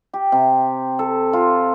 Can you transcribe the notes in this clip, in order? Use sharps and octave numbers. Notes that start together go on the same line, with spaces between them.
G4
C3
A4
F4